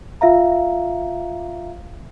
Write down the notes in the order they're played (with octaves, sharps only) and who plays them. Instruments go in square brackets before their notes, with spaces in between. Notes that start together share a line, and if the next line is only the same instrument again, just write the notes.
[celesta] F4 E5 F5 A#5